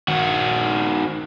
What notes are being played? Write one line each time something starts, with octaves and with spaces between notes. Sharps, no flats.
D#3 F#4